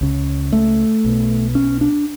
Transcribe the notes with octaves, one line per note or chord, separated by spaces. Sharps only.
C#2 C#3
A3
B1 B2
C#4
D4